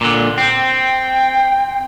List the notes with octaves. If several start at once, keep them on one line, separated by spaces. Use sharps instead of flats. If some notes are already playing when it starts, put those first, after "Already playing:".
A#2 D3
C4 G5